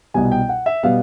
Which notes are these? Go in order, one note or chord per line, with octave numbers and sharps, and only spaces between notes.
C2 B2 G3 B3 G#5
G5
F#5
E5
B2 G3 B3 F5